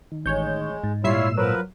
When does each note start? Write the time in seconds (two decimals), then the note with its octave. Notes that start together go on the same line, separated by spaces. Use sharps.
0.12 D#3
0.26 A1 G#3 C#5 G6
0.84 G#2
1.04 A#2 G3 E4 F4 C#5 E5 E6 C7
1.38 F3 F#3 A#4 B4